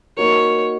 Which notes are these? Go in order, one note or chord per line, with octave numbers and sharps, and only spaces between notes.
A#3 D#4 F#4 A#4 C#5